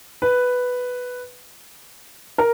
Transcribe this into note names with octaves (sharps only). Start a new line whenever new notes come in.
B4
A#4